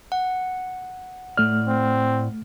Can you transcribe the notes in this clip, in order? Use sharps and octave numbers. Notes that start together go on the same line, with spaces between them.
F#5
A2 A3 D5 F6
C4